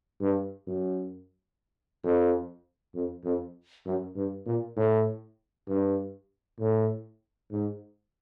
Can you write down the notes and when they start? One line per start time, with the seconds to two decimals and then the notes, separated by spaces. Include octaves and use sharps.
0.21 G2
0.67 F#2
2.04 F2
2.95 F2
3.24 F2
3.86 F#2
4.16 G2
4.46 A#2
4.77 A2
5.68 G2
6.59 A2
7.51 G#2